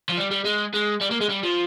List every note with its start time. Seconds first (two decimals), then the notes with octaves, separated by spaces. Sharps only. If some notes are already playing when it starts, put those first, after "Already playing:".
0.09 F3
0.17 G3
0.31 G3
0.45 G#3
0.74 G#3
1.01 G3
1.11 A#3
1.21 G#3
1.29 G3
1.43 F3